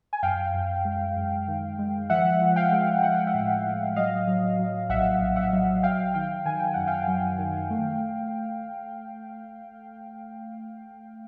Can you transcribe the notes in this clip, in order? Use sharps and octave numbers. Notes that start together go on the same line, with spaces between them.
G#5
F#2 F5 G5
F#2
G#3
F#2
D#3
G#3
F3 E5 F#5
F3
F5 G5
G#3
F3 F#5
G5
E5 F#5
A2
A2
F#3 D#5 F5
F#3
F#3
A#1 E5 F#5
A#1
E5 F#5
F#3
F#3 F5 G5
D#3 F5 G5
D#3 G#5
G5
F#2 F#5
F5 G5
F#3
D#3
A3